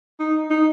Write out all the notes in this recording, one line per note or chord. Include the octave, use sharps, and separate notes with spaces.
D#4
D#4